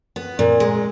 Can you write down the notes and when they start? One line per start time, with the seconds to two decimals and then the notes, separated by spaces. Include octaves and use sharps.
0.16 B3
0.39 A#2
0.60 G#3